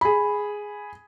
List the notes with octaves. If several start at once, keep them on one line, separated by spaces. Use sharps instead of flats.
G#4 B5